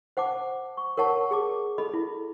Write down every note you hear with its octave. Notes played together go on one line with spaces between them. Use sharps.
C5 F#5 A5 D6
C#6
A#4 C#5 F#5 A5 C#6
G#4 A5 D6
A4 D#5 B5
E4